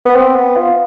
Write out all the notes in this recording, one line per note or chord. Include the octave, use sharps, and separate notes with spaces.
B3
C4
B3
F4